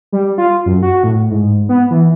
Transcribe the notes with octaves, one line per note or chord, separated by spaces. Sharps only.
G3
F4
F#2
F#4
A2
G#2
B3
E3